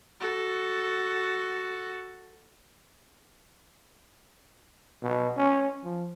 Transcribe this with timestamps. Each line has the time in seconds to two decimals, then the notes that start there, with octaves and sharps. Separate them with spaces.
0.20 F#4 A4
5.03 B2
5.37 C#4
5.84 F3